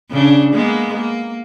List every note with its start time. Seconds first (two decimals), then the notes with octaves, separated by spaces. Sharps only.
0.11 C#3 D4
0.53 G#3 A#3 B3
0.94 A#3